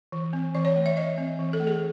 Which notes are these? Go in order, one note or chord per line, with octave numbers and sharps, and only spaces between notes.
E3
C4
E3 D5
C#5
A3
E5
E3 D#5
C4
E3
A4
A3
G#4